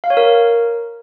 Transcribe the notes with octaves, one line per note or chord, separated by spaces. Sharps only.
F5
C#5
A#4